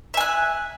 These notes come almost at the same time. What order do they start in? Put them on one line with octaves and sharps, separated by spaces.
E5 G#5 F#6